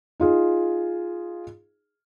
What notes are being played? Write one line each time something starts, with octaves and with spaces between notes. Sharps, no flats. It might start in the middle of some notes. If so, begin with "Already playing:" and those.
D#4 F4 G#4